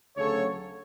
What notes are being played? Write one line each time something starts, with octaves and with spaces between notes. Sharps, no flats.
D2 C#3 F#3 A4 C#5